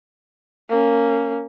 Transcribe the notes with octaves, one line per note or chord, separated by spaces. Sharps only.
A#3 C#4